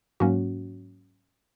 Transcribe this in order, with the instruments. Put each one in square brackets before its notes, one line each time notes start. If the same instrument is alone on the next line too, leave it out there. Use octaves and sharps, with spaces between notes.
[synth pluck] G#2 F#3 A#3 C#4 F#4